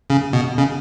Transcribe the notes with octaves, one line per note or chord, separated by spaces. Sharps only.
C#3
B2
C#3